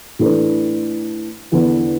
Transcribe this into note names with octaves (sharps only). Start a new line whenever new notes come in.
A2 E3 A3 D4 B4
E2 D3 B3 D4